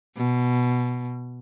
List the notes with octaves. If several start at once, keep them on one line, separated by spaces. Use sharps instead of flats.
B2